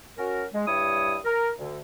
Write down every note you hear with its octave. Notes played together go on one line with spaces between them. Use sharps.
C#4 F#4 A#4
G#3
G2 G3 E4 C#5 D#6
A#4
D2 D3